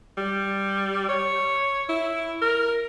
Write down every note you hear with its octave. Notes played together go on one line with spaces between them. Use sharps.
G3
C#5
E4
A#4